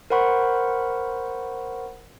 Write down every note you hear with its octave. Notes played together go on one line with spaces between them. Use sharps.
A#4 C5 F#5 B5 C#6